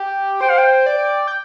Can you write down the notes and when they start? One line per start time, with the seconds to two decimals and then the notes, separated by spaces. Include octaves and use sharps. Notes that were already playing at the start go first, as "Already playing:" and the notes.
Already playing: G4
0.41 C5 G5
0.49 F5
0.58 G5
0.86 D5
1.27 G5